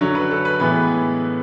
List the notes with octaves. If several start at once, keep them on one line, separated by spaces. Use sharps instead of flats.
F#2 D3 F#3 C#4 C#5
B4
A4
B4
A2 E3 G#3 B3 B4